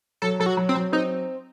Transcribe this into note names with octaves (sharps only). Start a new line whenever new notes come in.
F#3 A4
F#3 A4
F#4
F#3
C4
F#3
C4 D#4